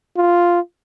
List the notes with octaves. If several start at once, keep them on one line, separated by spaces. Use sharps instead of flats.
F4